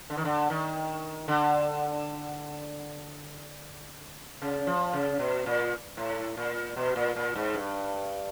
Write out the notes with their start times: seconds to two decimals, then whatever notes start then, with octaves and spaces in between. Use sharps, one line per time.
0.10 D3
0.17 D#3
0.25 D3
0.50 D#3
1.28 D3
4.42 C#3
4.67 F3
4.93 C#3
5.19 B2
5.46 A#2
5.97 A2
6.37 A#2
6.76 B2
6.96 A#2
7.16 A#2
7.35 G#2
7.54 G2